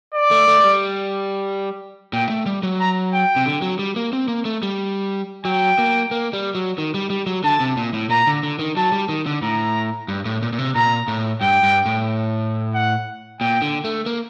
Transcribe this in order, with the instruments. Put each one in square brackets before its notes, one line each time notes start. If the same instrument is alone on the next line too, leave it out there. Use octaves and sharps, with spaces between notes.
[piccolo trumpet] D5
[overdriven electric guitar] A3
A3
A3
G3
[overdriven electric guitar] A#2 [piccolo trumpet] G5
[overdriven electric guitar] A3
G3
F#3
[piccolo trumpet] A#5
G5
[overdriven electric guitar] C3
D3
F#3
G3
A#3
C4
A#3
A3
G3
[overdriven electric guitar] F#3 [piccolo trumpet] G5
[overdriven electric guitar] A#3
A#3
G3
F#3
D#3
G3
G3
F#3
[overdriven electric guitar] D3 [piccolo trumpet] A5
[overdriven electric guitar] C3
A#2
A2
[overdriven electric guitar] A#2 [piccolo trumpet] A#5
[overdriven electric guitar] D3
D3
D#3
[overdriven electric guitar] F#3 [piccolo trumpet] A5
[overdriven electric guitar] G3
D#3
D3
[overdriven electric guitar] A2 [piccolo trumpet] A#5
[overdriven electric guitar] G2
A2
A#2
A#2
C3
[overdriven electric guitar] A#2 [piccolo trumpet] A#5
[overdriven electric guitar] A2
[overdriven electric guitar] G2 [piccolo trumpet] G5
[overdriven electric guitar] G2
A2
[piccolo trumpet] F#5
[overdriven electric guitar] A#2 [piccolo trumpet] G5
[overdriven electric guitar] D3
A3
A#3